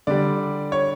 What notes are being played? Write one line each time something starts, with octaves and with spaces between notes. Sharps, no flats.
D3 G3 D5
C#5